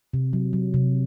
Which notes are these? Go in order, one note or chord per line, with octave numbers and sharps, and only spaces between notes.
C3
F#3
F#3
C3